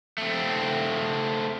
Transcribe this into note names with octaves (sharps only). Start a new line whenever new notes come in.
A3 C4